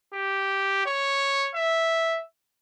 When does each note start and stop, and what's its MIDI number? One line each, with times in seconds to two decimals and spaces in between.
0.14 0.85 67
0.86 1.50 73
1.55 2.20 76